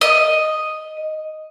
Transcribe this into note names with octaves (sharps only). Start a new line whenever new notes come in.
D#5